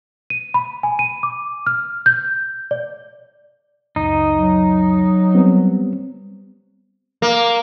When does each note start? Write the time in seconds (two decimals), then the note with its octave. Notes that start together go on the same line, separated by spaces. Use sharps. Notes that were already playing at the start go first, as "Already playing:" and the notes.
0.30 D#7
0.54 B5
0.83 G#5
0.99 D#7
1.23 D6
1.66 F6
2.06 G6
2.71 D5
3.96 C#2 F#2 D#4
4.33 F#3
5.35 G3 B3 C4
7.22 A#3